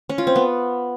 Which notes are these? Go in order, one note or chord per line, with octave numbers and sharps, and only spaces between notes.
C#4
F4
C4
B3